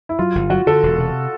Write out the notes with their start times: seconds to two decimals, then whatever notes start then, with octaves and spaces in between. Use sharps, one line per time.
0.09 E4
0.19 F#3 F4
0.35 G1
0.50 F#3 F#4
0.67 D3 A4
0.83 E1
0.99 C3